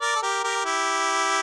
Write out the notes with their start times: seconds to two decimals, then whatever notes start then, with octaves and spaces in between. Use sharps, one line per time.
0.01 A#4 D5
0.16 A4
0.22 G4 A#4
0.44 G4 A#4
0.65 E4 G4